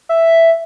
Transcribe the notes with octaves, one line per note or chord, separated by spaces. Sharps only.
E5